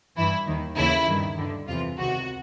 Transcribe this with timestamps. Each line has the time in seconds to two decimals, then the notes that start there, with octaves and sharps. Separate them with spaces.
0.16 G2 E3 E4
0.47 D#2 D#3
0.77 D#2 C#3 E3 E4
1.08 G2 D#3
1.38 G2 D3
1.68 E2 C3 E3 F4
1.98 C#2 C3 D#3 F#4